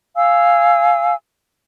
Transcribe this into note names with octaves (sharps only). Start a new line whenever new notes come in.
F5 G#5 E6